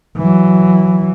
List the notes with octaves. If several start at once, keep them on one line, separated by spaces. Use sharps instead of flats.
E3 F#3